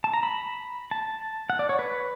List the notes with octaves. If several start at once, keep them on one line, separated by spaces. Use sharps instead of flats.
A5
A#5
B5
A5
F#5
D5
C#5
B4